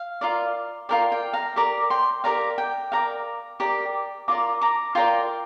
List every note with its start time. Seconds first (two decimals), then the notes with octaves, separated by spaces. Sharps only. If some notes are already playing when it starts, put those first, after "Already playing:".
Already playing: F5
0.21 F4 A#4 D5
0.89 F4 A#4 D5 G5
1.12 G5
1.33 F5 A#5
1.56 G4 A#4 D5 A#5 D6
1.90 G5 C6
2.24 G4 A#4 D5 F5 A#5
2.58 G5
2.92 G4 A#4 D5 F5 A#5
3.60 G4 A#4 D5
4.28 F4 A#4 D5 A#5 D6
4.61 A#5 D6
4.95 F4 A#4 D5 G5 C6